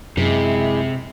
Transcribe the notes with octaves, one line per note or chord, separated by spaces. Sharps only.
F#2 C3 G#3 E4 G#4